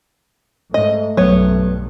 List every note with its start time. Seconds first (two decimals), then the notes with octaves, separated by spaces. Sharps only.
0.74 G#2 A3 D#5
1.17 B1 G2 F#3 B3 C#5